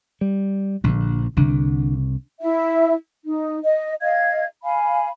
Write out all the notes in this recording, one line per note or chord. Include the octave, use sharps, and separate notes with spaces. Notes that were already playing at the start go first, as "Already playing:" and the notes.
G3
A#1 D3
C2 D3
E4 E5
D#4
D#5
D#5 F5 G#6
F5 G#5 B5